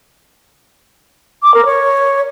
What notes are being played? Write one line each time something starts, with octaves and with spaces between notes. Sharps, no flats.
D6
A#4
C#5